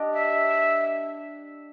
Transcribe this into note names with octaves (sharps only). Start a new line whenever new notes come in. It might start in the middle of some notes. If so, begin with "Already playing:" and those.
Already playing: D4 G4 D#5
E5